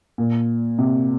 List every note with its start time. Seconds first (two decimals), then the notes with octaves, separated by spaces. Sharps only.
0.18 A#2
0.78 C3